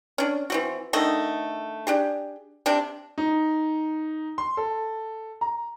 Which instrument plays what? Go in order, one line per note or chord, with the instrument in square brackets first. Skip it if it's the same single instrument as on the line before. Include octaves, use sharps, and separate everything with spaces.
[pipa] C#4 D4
E3 C4 F#4
D3 D#3 A3 D#5
D4 G4 G#4
C3 C4 D4
[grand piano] D#4
C6
A4
A#5